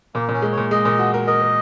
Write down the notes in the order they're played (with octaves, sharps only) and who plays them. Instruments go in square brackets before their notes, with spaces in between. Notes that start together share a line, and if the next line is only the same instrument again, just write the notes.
[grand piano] A#2 [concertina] A#3
[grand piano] A#2 [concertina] C#4
[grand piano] G#3
[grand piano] A#2 [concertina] C#5
[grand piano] G#3 [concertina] D#5
[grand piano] A#2
F#4
A#4
[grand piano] A#4 [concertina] D#5
[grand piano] A#4